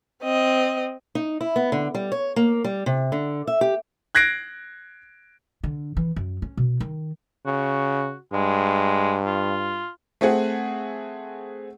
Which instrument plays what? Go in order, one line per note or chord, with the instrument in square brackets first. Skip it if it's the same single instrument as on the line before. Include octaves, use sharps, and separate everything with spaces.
[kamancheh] C4 D#5
[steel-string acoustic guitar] D#4
E4
B3
D3
G3
C#5
A#3
G3
C3
D3
E5
G4
[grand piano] F#6 G#6 A#6 C7 D7
[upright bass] D3
E3
F#2
C#4
B2
D#3
[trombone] C#3 [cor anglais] F#4
[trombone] G2 [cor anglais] G#3
[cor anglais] F4
[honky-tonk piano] A3 C4 G#4 F#5